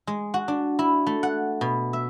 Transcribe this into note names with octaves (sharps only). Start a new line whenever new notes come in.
G#3
F#4
D4
E4
A3
F#5
B2
E5